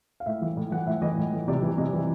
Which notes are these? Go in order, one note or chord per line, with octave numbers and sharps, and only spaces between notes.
F5
A2 E5
E3
A2
E3 F#5
A2 E5
E3 D#5
A2
E3
C3 D5
E3
C3 D#5
E3